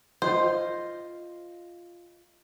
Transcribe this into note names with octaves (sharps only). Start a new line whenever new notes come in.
F4 C5 D#5 F5